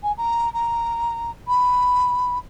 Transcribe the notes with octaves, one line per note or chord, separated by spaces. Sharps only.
G#5
A#5
A#5
B5